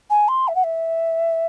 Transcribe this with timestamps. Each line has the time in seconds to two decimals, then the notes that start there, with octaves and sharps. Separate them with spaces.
0.10 G#5
0.28 C6
0.48 E5
0.55 F#5
0.64 E5